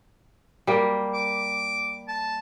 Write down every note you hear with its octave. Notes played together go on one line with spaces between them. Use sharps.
G3 A#3
D6
A5